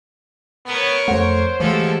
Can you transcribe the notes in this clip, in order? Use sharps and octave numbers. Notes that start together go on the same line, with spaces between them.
B3 A#4 C#5
F2 A3 C5 F#5
D3 E3 F3 G#3 A3 G4 A4